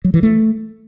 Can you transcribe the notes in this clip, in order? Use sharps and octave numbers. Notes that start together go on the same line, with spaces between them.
F#3
E3
A3